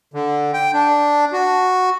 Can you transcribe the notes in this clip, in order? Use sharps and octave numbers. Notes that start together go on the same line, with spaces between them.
D3
G5
D4
F#4